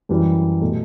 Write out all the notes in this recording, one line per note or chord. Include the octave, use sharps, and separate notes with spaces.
F#2 E3 G3
B2 A3